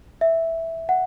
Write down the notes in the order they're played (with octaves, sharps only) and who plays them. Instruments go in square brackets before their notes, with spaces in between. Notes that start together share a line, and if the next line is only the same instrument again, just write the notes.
[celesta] E5
F#5